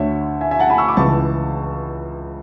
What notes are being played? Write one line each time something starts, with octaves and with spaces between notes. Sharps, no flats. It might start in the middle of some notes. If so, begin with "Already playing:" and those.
Already playing: D2 D3 C#5 E5
E5 G#5
E5 G#5
F#5 A5
G#5 B5
C#6 E6
B5 D6
C#2 C#3 E3 A5 C#6